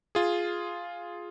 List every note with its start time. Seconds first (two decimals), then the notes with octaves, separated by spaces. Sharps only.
0.15 F4 G#4